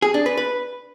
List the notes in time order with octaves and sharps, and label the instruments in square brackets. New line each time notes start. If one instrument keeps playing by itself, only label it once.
[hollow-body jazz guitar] G#4
D4
B4
B4